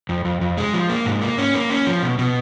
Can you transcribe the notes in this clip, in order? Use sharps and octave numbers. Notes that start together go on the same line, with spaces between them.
F2
F2
F2
G#3
F3
A#3
G#2
A#3
C#4
A#3
C#4
F3
B2
B2